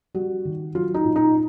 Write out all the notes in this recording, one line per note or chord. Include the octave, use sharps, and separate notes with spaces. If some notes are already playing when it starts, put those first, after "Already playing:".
G3 F#4
D#3
F#3 F4
D#4
A#2
D#4